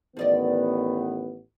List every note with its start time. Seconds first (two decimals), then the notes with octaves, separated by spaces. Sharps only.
0.17 A1 D#3 F3 B3 D5 D#5